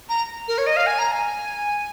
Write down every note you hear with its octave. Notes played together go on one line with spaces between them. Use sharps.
A#5
A#4
C#5
D#5
F5
G#5
A#5
G#5